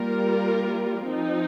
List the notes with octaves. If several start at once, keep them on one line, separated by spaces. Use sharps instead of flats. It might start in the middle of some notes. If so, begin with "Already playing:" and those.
Already playing: G3 A#3 F4 A#4
F3 C4 D#4